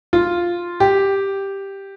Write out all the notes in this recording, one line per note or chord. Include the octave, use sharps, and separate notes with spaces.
F4
G4